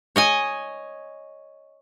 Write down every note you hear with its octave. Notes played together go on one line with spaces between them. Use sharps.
C#5 D#5 G#5